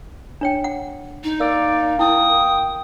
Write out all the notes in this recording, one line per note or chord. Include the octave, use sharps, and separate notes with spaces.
D4 C#5 G5
F#5
D#4
A#3 D5 E6
E4 G5 D#6